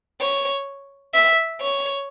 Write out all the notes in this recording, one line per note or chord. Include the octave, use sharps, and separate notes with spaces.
C#5
E5
C#5